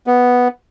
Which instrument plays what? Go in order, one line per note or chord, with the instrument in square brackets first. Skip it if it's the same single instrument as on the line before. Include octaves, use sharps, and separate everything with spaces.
[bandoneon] B3